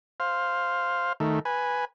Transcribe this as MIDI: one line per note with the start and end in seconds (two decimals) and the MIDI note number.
0.20 1.13 72
0.20 1.13 77
1.20 1.39 51
1.20 1.39 57
1.45 1.85 71
1.45 1.85 80